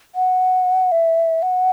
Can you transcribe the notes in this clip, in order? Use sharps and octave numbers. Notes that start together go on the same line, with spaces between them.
F#5
E5
F#5